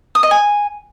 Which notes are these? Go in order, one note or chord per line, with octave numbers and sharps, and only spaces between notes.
D#6
D#5
G#5